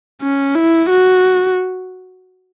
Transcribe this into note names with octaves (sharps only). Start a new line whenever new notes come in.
C#4
E4
F#4